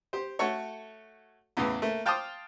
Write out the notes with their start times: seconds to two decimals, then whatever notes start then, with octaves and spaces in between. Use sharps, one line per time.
0.13 G4 C5
0.39 A3 F#4 A4 C#5
1.57 E2 A2 C#3 E3
1.82 A3 A#3
2.06 F5 G5 A5 C6 D6 D#6